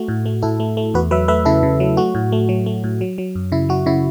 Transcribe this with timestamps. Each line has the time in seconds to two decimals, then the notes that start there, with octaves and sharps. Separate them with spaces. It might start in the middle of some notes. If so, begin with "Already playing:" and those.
Already playing: A3 F#4
0.08 A2
0.26 A3
0.42 A2 E4 A4
0.60 A3
0.77 A3
0.94 E2 F#4 B4
1.11 F#3 B4 E5
1.28 A3 B4 E5
1.45 C#3 E4 A4
1.63 C#3
1.80 F#3
1.97 A3 F#4
2.15 A2
2.32 A3
2.49 F#3
2.66 A3
2.84 A2
3.01 F#3
3.18 F#3
3.35 F#2
3.52 C#3 E4
3.69 F#3 F#4
3.86 C#3 E4